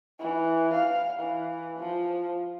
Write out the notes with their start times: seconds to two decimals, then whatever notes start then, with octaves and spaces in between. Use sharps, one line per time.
0.19 E3
0.73 F5
1.19 E3
1.79 F3